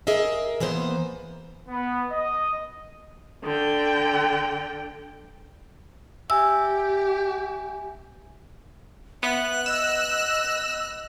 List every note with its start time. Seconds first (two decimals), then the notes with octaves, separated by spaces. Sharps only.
0.07 G#4 A#4 D#5 E5
0.60 E3 A#3 B3 C5
1.68 B3
2.10 D#5
3.44 D3 G5
6.30 G4 E5 G#5 E6
9.23 B3 E5 F#6
9.66 D#5 E6